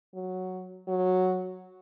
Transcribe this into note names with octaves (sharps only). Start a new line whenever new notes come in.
F#3
F#3